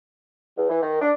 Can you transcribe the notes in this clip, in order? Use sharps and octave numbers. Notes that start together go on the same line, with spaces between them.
E2
E3
D#3
D4